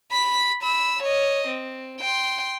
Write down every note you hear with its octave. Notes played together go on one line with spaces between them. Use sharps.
B5 B6
B5 E6
C#5 D#5
C4
G5 C6